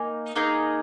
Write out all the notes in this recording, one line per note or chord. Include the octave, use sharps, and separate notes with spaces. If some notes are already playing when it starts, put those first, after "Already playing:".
Already playing: A#3 D#4 G#5
A#3 D#4 G#4